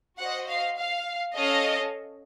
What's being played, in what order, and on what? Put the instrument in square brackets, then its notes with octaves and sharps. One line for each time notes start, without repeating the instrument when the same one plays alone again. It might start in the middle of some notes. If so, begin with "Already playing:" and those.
[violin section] F#4 C5 D#5 [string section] F#5
[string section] F5
F5
[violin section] C#4 A4 C#5 F5 A5 [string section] D#5